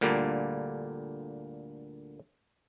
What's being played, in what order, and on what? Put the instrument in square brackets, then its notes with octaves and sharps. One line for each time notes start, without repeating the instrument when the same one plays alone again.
[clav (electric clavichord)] D2 A#2 D3 G3 A#3